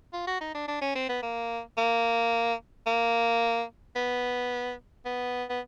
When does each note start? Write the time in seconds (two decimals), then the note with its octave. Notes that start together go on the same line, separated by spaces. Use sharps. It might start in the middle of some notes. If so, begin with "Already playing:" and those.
0.13 F4
0.27 F#4
0.40 D#4
0.54 D4
0.68 D4
0.81 C#4
0.95 C4
1.09 B3
1.22 A#3
1.77 A#3
2.86 A#3
3.96 B3
5.06 B3
5.49 B3